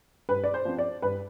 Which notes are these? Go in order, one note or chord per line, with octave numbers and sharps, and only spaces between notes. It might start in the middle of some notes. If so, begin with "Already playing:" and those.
G2 B4
D5
C5
F3 C4
D5
G2 B4